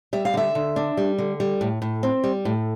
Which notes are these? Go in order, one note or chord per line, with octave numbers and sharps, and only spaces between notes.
G3 E5
F5
D3 E5
D3
D4
G3
D3
G3
A2
A2
C4
G3
A2